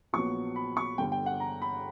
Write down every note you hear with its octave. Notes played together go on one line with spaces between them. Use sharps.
A#1 A#2 F#3 B3 C#6
B5
C#6
G1 G2 D3 G5
G5
F#5
A#5
B5